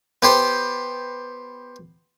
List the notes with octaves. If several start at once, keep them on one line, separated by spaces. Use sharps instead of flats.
B3 G4 C5